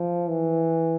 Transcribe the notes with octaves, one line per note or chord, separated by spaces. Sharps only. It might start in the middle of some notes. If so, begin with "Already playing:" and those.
Already playing: F3
E3